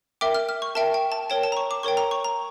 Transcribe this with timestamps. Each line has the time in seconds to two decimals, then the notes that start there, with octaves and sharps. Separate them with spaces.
0.21 A#4 E5 G5 D6
0.34 F6
0.49 F6
0.62 C#6
0.75 A#4 E5 G5 A5
0.94 G5
1.12 A5
1.30 A#4 C#5 G5 A5
1.43 A5
1.52 A#5
1.57 C#6
1.71 D6
1.83 A#4 C#5 G5 C#6
1.97 A#5
2.11 C#6
2.24 A#5